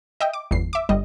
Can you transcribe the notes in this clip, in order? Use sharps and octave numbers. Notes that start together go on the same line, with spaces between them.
D#5 E5 G5
D6
G1 E2 C7
E5 D6
G1 G3 D#5